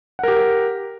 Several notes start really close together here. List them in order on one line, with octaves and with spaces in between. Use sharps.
F#5 A#4 G4